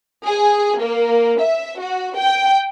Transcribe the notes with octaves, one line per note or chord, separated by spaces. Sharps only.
G#4
A#3
E5
F#4
G5